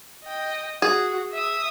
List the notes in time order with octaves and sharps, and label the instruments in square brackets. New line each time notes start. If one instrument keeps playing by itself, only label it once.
[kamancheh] D#5 G5
[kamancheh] F#4 [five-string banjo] G#4
[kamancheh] E5 D#6